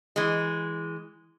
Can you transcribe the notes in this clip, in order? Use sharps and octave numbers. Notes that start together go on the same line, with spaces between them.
E3 G#3